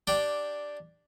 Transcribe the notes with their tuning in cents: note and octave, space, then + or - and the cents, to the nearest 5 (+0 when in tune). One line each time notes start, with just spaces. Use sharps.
D4 +0 G4 -5 G5 +0